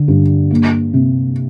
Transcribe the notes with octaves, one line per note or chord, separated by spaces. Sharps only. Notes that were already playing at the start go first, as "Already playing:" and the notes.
Already playing: D3
G2
A#3
C3